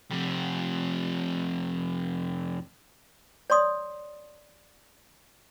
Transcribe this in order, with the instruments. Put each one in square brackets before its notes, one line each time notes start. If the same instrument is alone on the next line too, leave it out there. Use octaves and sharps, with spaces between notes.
[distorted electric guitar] F2 C3
[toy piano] C#5 D5 C6 D#6